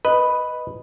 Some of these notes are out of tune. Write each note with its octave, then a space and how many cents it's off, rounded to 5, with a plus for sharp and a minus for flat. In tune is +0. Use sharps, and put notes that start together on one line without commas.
B4 +0 D#5 +0